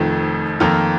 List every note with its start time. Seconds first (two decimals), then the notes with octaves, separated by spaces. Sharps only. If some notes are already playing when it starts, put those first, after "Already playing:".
Already playing: F1 F2 D#3 A3
0.60 F2 D#3 A#3 F4 A4